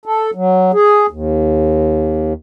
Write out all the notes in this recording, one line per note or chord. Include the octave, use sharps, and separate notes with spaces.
A4
F#3
G#4
D#2